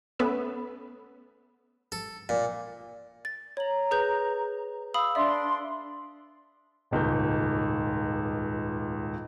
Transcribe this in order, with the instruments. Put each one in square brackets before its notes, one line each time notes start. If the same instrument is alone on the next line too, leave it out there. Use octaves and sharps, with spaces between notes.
[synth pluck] A3 B3 C#4 B4 E5
[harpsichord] A4
A#2
[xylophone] A6
[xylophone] C#5 F#7 [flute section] A#5
[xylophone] G#4 B4 G6
[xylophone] F5 B5 D#6 [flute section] E6
[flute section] D4 C6 [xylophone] D5 E5
[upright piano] D#1 C#2 G#2 G6